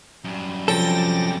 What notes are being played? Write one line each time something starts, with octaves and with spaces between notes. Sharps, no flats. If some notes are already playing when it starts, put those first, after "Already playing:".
F#2 G3
C3 F3 C#4 A4 G5 A6 A#6